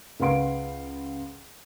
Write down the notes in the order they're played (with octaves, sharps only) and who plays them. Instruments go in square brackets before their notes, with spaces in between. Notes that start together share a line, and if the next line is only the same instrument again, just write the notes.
[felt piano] C#2 B4 F5 F#5 C6 D7